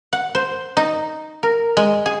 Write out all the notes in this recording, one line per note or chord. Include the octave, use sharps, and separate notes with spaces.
F#5
C5
D#4
A#4
G#3
G#4